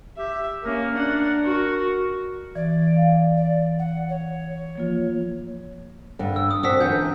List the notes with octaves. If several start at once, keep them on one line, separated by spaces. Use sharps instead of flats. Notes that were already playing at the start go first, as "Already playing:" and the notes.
G4 E5
A#3 C#4 A#4
D4 F#5
F#4
E3 D5
F5
D5
F#5
C#5
F3 A#3 F4
G2 D3
E6
D#6
C4 D4 F#4 D#6 E6 B6
F#2 D3 E3 G6